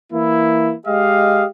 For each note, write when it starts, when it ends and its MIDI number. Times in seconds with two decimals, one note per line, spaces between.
0.13 0.73 52
0.13 0.73 58
0.13 0.73 64
0.87 1.46 56
0.87 1.46 67
0.87 1.46 75
0.87 1.46 77